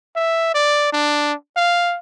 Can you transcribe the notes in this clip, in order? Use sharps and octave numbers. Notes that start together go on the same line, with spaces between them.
E5
D5
D4
F5